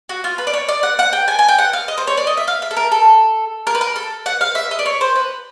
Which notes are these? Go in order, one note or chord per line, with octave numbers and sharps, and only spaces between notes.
F#4
F4
B4
D5
C#5
D5
F#5
F#5
G5
G#5
G#5
G5
F#5
F5
D#5
C5
C#5
D5
D#5
E5
F5
E5
A4
A#4
A4
A#4
B4
A#4
A4
F#5
F5
E5
D#5
D5
C#5
C5
B4